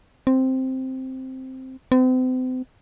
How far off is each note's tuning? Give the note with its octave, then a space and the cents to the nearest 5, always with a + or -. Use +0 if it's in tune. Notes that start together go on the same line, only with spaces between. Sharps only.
C4 +0
C4 -40